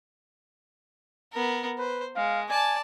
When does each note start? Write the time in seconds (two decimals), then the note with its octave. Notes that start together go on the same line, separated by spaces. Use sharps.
1.32 B3 A#4
1.78 B4 C5
2.16 G#3 F5
2.49 D5 G#5 A5